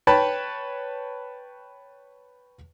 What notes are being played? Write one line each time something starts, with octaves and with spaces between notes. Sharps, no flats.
B4 C#5 G5 A5 B5